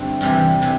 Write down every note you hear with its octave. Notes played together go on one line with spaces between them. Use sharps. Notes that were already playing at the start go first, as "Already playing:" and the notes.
Already playing: G2 D3 A3 C4
E2 C3 E3 G3
C3 E3